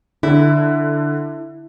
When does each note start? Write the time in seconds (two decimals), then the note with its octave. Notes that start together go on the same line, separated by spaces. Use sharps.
0.23 D3 E4